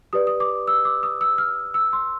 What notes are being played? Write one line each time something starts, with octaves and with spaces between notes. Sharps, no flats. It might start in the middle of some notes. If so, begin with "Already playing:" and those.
G4 B4 D5 D#6
D#6
D6
E6
D6
D#6
E6
F6
E6
C6